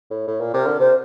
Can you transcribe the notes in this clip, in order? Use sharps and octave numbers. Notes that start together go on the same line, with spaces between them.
A2
A2
A#2
C3 A#4
D3
C3 C5